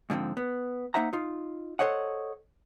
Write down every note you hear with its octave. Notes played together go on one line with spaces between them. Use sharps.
G#2 D3 F3 C4
B3
A#3 D#4 C5 E5 F#5 A#5
D#4 F4
A4 C5 C#5 D#5 F#5